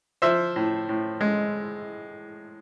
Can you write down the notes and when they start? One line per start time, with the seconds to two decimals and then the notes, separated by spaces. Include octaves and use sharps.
0.22 F3 C5 E5
0.56 A2
0.89 A2
1.21 G#3